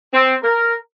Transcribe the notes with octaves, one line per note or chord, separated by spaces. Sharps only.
C4
A#4